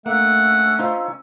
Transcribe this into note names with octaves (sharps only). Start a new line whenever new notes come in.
A3 A#3 C#4 D4 F#5 E6
D#4 F4 C5